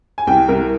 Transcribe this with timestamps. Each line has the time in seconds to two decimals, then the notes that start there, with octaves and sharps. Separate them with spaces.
0.18 G#5
0.27 C2 G5
0.48 C2 A#4